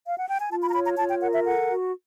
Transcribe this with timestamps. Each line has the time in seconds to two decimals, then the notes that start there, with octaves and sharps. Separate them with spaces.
0.07 F5
0.18 F#5
0.29 G5
0.39 G#5
0.50 F4 A5
0.62 B5
0.69 A#5
0.74 C#5 B5
0.86 A#5
0.98 F4 A5
1.09 G5
1.21 A#4 F#5
1.33 E5
1.45 A4 F#5
1.69 F#4